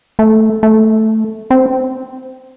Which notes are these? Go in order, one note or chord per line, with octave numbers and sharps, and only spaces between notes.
A3
A3
C4